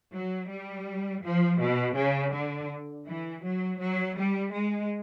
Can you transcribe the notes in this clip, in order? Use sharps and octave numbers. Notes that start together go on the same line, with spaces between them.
F#3
G3
F3
B2
C#3
D3
E3
F#3
F#3
G3
G#3